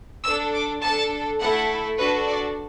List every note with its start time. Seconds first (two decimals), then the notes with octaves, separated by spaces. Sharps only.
0.24 D4 A4 E6
0.54 D6
0.82 D4 A4 A5
1.40 A3 E4 A4 F#5
1.98 D4 F#4 A4 B4
2.28 D5